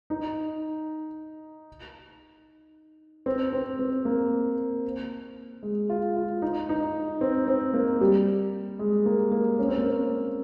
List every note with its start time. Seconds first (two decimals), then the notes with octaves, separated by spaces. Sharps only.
0.10 D#4
3.26 C4
3.53 C4
3.79 C4
4.05 A#3
5.63 G#3
5.90 F4
6.17 F4
6.42 D#4
6.69 D#4
7.21 C4
7.48 C4
7.74 A#3
8.01 G3
8.79 G#3
9.06 A#3
9.32 A#3
9.59 C#4
9.68 C4
9.78 A#3
9.87 C4